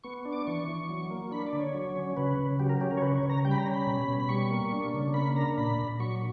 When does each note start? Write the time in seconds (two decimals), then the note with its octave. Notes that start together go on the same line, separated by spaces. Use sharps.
0.04 B3 C#6
0.25 D4
0.33 D6
0.47 E3 C#6
0.68 E3
0.89 F#3
1.11 A#3
1.31 D4 B5
1.47 D5
1.53 D3
1.60 C#5
1.74 F#3
1.96 C#4
2.17 C#3 B4
2.39 C#3
2.59 F#3 G4
2.69 A#4
2.81 C#4 G4
2.91 A#4
2.97 C#5
3.02 C#3 B4
3.15 C#5
3.23 C#3
3.30 A#5
3.45 G3 G5
3.51 B5
3.58 A#5
3.66 C#4
3.73 B5
3.87 B2
4.08 B2
4.20 B5
4.29 G3 C#6
4.51 A#3
4.72 D4
4.94 C#3
5.14 A#3 B5
5.36 D4 A#5
5.58 A#2 B5
5.79 A#2
6.00 F#3 C#6